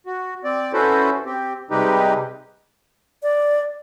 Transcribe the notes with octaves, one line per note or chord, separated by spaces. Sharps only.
F#4
C4 D5
C#4 E4 F#4 A4 B4 C5
C4 G4
C3 G3 G#3 D#4 G4 B4
D5